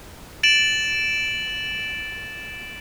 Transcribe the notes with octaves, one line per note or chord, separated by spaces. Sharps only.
A6 D7 E7 F#7